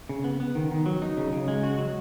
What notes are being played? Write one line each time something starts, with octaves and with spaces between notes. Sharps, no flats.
C#3
B3
B3
D#3
D#3
F#3
D#4
C#3
C#3
G#3
F#4
F#3